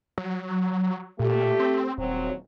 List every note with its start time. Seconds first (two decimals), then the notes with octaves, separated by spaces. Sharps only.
0.18 F#3
1.19 A#2 A3 G4
1.59 C4
1.98 D#1 F#3 C4